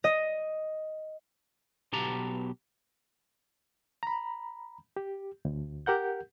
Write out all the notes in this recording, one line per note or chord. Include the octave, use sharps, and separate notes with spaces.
D#5
B1 B2 G4 A5 A#5
A#5 B5
G4
D2
G4 A#4 F#5 G6